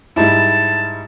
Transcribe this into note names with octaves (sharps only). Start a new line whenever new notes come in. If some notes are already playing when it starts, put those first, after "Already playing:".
G#2 G3 E4 A5